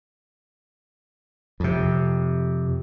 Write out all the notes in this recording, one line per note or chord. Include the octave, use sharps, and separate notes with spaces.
F2 C3